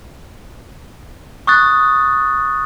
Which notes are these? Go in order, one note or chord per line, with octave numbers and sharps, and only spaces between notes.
C#6 D#6 F#6 A6